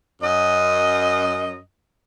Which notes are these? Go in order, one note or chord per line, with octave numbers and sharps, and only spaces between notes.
F#2 D#5